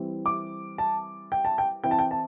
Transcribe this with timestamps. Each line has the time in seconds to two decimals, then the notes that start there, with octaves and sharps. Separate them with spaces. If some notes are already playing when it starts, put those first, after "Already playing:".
Already playing: E3 G3 C4 E4
0.26 D6
0.78 A5
1.32 G5
1.45 A5
1.58 G5
1.84 E3 C4 E4 G5
1.91 A5
1.99 G5
2.11 A5